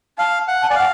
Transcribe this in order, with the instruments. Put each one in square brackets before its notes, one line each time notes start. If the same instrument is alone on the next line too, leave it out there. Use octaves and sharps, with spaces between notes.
[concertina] F5 [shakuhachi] A5
[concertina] F#5
[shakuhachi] A5
[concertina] D5 [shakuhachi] G#5
[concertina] F5 [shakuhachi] F#5